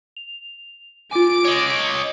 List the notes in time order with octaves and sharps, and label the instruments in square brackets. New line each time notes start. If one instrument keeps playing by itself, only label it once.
[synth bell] F7
[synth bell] F4 G#5 [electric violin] D6 D7
[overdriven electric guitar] C#5 D#5